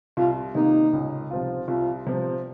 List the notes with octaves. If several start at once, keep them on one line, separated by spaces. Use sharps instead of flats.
C2 F4
C3 D#3 A#3 D#4
C#2
C3 F3 C4 F4
C2 F4
C3 F3